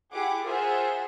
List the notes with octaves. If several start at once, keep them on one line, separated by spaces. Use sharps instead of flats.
E4 G4 G#4 F#5 D6
F4 G#4 A#4 C5 E5 F#5